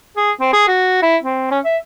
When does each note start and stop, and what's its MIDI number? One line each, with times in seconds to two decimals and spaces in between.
0.17 0.32 68
0.41 0.50 60
0.53 0.68 68
0.68 1.01 66
1.02 1.17 64
1.23 1.49 60
1.51 1.60 61
1.65 1.77 76